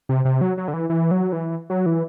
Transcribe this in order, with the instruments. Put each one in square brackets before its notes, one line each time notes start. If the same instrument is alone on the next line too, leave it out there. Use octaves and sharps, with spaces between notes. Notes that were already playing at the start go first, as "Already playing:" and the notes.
[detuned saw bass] C3
C3
F#3
F#3
D3
E3
E3
F#3
E3
F#3
E3